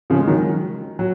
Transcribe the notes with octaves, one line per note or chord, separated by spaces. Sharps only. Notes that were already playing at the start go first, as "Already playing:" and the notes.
C#3 F3
G#3
D#3 F#3
F#3